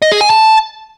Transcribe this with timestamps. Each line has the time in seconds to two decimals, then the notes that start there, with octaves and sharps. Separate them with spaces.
0.02 D#5
0.12 G#4
0.21 G#5
0.30 A5